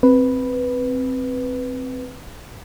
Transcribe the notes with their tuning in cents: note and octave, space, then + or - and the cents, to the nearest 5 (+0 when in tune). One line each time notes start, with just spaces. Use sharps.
C4 +0 B4 +0